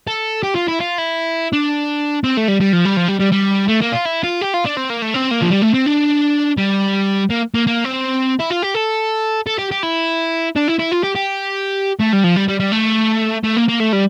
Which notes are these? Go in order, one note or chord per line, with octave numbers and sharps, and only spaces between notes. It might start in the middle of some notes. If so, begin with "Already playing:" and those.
A4
G4
F4
E4
F4
E4
D4
C4
A3
G3
G3
F3
G3
F3
G3
G3
G3
A3
A#3
F4
E4
F4
G4
F4
D4
C4
A#3
A3
C4
A#3
F3
G3
A3
C4
D4
G3
A#3
A#3
A#3
C4
E4
F4
G4
A4
A4
G4
G4
E4
D4
E4
E4
F4
G4
G4
A3
G3
F3
G3
G3
G3
A3
A3
A#3
A#3
A3
G3